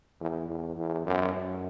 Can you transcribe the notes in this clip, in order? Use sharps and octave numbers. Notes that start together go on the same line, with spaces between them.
E2
E2
E2
F#2
F#2